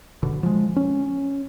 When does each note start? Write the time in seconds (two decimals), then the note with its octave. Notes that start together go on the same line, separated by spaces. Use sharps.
0.23 F#1 B2 D3
0.43 F3 G#3
0.76 C#4